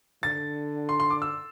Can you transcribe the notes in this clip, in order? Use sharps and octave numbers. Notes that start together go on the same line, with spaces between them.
D3 A6
C6
C6
D6
E6